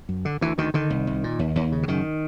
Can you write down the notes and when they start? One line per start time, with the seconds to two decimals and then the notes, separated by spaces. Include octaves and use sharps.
0.09 F#2
0.25 D3
0.41 D2 E3
0.58 D2 D#3
0.74 D3 D#3
0.90 C2
1.07 C2
1.24 A#2
1.39 D#2
1.56 D#2
1.72 C#3
1.83 D3
1.88 F#2 D#3